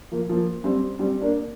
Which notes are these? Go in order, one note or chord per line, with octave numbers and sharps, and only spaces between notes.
F3 A#3
F3 A#3
G3 C4
G3 C4
A#3 D4